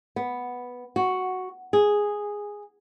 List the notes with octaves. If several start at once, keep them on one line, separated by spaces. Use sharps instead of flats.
B3
F#4
G#4